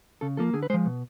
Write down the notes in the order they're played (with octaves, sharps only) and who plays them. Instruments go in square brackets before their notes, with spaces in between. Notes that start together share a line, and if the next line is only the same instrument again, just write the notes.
[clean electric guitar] C#3 A4
F3 A#3 A4
D3 G#4
B4
G#3 C5
F3
B2